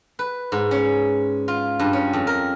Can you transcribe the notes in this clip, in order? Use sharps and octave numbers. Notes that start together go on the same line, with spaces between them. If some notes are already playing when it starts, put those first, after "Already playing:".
B4
G#2
C#4
F4
G2
C#4
F2
A#4